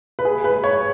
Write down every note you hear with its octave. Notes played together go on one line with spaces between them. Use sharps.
B4
G#4
B4
C#5